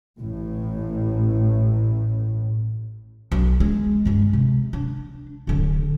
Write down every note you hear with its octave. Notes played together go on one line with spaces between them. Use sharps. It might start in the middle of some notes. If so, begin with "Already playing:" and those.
A1 A2
B1
G#3
G2 G#3
C3
D4
D1 D3